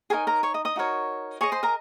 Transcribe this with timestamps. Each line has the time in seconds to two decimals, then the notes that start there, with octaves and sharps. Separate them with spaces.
0.10 D#4 G#4 A#4 C#5 G#5
0.27 A#4 A#5
0.43 C#5 C#6
0.54 D#5 D#6
0.65 D#5 D#6
0.76 D#4 F#4 A#4 C#5
1.41 G#4 C#5 D#5 C#6
1.52 C5 C6
1.63 A#4 A#5